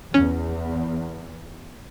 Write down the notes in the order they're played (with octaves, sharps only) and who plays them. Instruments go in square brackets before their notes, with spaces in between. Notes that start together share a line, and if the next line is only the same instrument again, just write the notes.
[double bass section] E2 [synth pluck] C#4